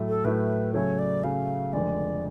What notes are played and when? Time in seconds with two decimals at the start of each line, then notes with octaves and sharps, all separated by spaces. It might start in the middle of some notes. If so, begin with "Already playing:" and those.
Already playing: A2 F#3 A3
0.08 A4
0.25 A2 F#3 A3 B4
0.74 C#3 F#3 A3 C#5
0.99 D5
1.23 C#3 F#3 A3 F5
1.73 F1 F2 D3 F3 G#3 D5